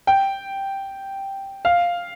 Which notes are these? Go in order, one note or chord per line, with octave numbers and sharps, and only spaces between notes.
G5
F5